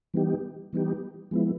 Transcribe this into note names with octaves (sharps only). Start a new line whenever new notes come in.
E3 G3 B3 D#4 G4
E3 G3 B3 D#4 G4
F3 G#3 B3 E4